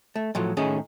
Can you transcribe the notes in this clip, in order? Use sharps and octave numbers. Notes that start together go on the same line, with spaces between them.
A3
A2 F3 F#3
A2 D#3 C#4 D#4 G#4